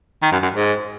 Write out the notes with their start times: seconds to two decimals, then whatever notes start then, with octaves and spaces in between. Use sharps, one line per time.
0.22 D#3
0.32 F#2
0.42 F#2
0.54 G#2